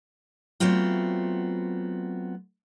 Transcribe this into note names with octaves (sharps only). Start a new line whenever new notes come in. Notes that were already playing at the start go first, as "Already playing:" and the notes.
F#3 A3 B3 C4 F4